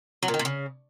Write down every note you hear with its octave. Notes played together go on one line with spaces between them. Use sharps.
F#3
A#2
D#3
A#2
C#3